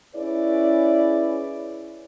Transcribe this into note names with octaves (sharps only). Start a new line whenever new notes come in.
C#4 E4 G#4 B4 C#5 D5